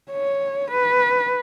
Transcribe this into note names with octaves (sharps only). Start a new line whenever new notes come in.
C#5
B4